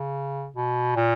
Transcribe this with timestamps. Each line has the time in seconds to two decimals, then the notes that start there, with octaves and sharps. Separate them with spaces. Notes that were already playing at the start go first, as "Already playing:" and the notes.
Already playing: C#3
0.56 B2
0.96 A#2